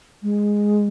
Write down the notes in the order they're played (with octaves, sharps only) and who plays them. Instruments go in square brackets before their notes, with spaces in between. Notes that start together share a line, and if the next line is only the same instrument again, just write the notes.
[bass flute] G#3